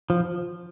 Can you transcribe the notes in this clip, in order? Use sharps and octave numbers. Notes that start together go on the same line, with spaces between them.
F3